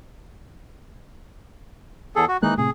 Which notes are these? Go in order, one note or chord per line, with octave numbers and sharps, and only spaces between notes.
E2 G#4 A4
F#4
D#3 E3 G#3 A#3 D#4 F#6
A2 C3 G#4